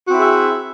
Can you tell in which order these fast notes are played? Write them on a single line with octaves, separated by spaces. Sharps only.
F#4 C4 E4 G#4 E5